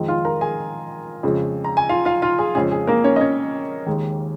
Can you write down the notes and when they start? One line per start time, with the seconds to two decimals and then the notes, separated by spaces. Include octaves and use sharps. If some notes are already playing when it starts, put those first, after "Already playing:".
Already playing: F2 D#3 G#3
0.08 F4 F5
0.25 A#4 A#5
0.41 G#4 G#5
1.23 F2 C#3 G#3
1.64 A#5
1.77 G#5
1.89 F4 F5
2.05 F4 F5
2.22 F4 F5
2.38 G#4 G#5
2.55 F2 C#3 G#3 C#4 G#4
2.71 G#4
2.87 A#3 A#4
3.04 C#4 C#5
3.16 D#5
3.21 C#4 C#5
3.86 D#2 D#3 G#3